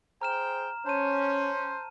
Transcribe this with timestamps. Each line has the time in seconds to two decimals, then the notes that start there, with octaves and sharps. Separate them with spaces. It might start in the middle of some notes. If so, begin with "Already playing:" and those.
0.21 G#4 C5 G5 A#5 F6 E7
0.86 C#4 C5 C#5 A5 D#7